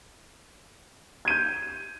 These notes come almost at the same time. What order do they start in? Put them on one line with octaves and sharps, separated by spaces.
G#6 D#7 G6